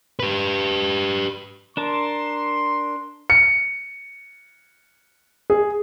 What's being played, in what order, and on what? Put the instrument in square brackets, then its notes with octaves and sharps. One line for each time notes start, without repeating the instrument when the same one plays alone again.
[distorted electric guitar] G4 B4
[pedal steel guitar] D4 A#4 A5 [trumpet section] C6
[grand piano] C#7
G#4